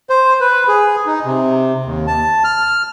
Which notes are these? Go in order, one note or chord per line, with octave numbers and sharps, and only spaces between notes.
C5
B4
G#4
D#4
C3
D#2
A5
F6